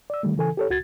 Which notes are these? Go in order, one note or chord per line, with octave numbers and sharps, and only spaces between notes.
D5 E6
D#3 G3 A3
C#3 E3 A4 G#5
G4 A4 C#5
C#2 F#4 G#6 A6